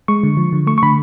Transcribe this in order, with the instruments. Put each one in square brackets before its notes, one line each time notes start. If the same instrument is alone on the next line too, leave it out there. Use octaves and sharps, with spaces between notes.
[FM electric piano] G#3 C#6
D3
F3
D3
A3 C#6
C#6
D3 B5